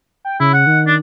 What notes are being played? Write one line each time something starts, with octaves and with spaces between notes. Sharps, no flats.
G5
C#3 E4
F#5
D#3
D4